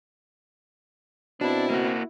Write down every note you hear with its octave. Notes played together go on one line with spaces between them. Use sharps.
B2 C4 D4 E4
A#3 F#4